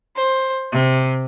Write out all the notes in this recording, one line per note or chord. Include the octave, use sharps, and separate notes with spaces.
C5
C3